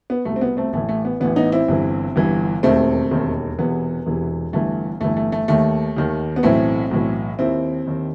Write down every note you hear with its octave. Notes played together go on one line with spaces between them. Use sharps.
B3
C2 B2 A3
C4
B3
A3 C4
A1 A2 E3 A3
A3
B3
A1 A2 E3 B3
B3 D#4
C4 E4
G1 G2 E3
G1 G2 E3
E1 D#2 D#3 A3 C4
E1 D#2 D#3
E1 E2 C3 E3 B3
E1 E2 C3 E3
G1 G2 E3 A3
G1 G2 E3 A3
A3
A3
D#2 D#3 A3
D#2 D#3
B3
B1 A2 E3 A3 C4
B1 A2 E3
D#2 D#3 C4 E4
D#2 D#3